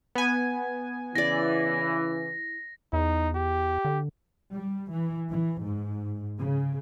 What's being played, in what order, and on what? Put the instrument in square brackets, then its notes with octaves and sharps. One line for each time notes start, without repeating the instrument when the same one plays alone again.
[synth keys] B3 G#5
[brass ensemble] C#3 E3 [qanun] E4 D5 [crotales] A#6
[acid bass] E2 [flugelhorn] D#4
[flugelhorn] G4
[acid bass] D3
[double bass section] G3
E3
E3
G#2
C#3